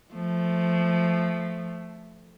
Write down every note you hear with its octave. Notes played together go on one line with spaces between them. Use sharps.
F3 A3